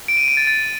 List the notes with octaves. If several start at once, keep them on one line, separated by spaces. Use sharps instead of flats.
D7
D#7
D7
A6
A6